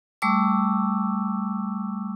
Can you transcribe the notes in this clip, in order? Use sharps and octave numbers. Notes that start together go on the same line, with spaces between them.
G3 A3 C#6 D6 E6